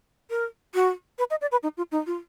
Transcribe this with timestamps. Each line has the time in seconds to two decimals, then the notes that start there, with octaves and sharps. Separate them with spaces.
0.30 A#4
0.74 F#4
1.18 B4
1.30 D#5
1.41 D5
1.52 B4
1.63 D#4
1.77 F4
1.92 D#4
2.06 F4